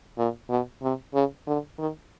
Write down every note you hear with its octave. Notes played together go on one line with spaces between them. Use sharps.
A#2
B2
C3
C#3
D3
D#3